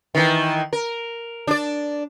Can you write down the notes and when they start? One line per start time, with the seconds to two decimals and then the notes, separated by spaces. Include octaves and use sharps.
0.15 D#3 E3
0.73 A#4
1.47 D4 D5